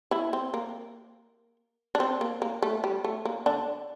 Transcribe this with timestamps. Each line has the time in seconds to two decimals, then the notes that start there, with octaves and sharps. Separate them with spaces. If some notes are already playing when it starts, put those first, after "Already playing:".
0.11 E3 E4
0.33 C4
0.54 A#3
1.95 D4
2.00 C4
2.21 A#3
2.42 A#3
2.62 A3
2.84 G3
3.04 A3
3.25 A#3
3.46 D3 D4